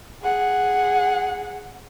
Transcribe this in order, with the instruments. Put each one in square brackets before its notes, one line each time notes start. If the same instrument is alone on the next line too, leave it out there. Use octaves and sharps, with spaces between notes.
[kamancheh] G#4 F#5